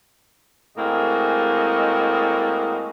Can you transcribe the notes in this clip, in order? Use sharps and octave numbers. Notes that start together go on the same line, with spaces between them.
A2 G#3 A#3 C4 F#4 D#5